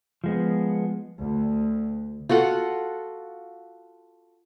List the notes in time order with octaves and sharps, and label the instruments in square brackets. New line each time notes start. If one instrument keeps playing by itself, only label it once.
[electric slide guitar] F3 G#3 B3
[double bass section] D2
[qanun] F4 F#4 A4 F#5